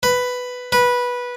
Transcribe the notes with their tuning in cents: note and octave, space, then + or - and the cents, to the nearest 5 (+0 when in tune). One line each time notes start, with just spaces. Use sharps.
B4 +5
B4 -15